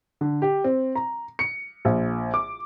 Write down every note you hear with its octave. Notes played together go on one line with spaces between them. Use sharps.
D3
G4
C4
A#5
C#7
A#1
D6